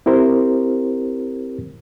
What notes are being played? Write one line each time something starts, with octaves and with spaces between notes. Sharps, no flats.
C4 E4 G4 A#4 C5